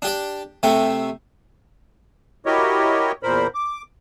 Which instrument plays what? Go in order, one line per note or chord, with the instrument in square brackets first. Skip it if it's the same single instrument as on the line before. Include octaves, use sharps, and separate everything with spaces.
[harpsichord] D4 G4 D5
C3 A3 G4
[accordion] E4 F#4 G4 A#4 C#5 D#5
E2 A#2 A#4 C5 B5
D6